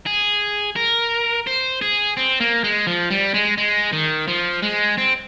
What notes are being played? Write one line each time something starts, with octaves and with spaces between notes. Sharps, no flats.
G#4
A#4
C5
G#4
C4
A#3
G#3
F3
G3
G#3
G#3
D#3
F3
G#3
C4